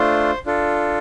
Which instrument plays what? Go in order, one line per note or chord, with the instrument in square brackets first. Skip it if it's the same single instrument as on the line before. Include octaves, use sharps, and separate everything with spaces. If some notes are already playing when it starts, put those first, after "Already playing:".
Already playing: [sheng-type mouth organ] A3 D4 F4 C5
D4 F4 A4